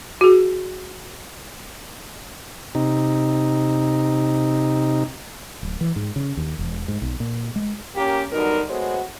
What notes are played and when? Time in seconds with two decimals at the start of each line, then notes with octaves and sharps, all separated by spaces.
0.21 F#4 G#4
2.75 C3 D#4
5.63 D1
5.81 E3
5.96 G#2
6.16 C#3
6.37 D#2
6.59 E1
6.88 G#2
7.02 B1
7.20 A#2
7.56 G#3
7.96 A#3 C#4 G4
8.32 B2 D3 F#3 G3 D#4 A#4
8.69 G#3 A3 B3 F#4 C5 C#5